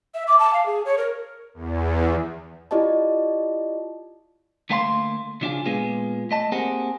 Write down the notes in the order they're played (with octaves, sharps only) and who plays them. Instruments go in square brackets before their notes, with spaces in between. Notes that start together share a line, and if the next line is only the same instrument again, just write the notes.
[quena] E5
D6
A5
F5
G#4
C#5
A#4
[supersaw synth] E2
[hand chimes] E4 F4 G4 D5 D#5 A5
[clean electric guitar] D2 A3 A#3 F5 A5 C6
C#3 F3 D4 D#4 F4 G#4
A#2 G#3 B3 F4 G#4
A3 D#5 A5
A#3 C4 G4 G#4 A#4 F#5